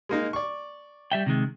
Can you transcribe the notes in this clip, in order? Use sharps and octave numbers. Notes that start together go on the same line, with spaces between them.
G#3 A#3 D#4
D5 C#6
G3 E5 G5
C3 D#3 G#3